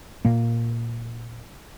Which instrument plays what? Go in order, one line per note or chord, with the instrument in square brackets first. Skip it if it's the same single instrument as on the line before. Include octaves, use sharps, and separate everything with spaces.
[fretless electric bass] A#2 A#3